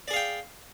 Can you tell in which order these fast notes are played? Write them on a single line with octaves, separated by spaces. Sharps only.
D5 G#4 F5 G5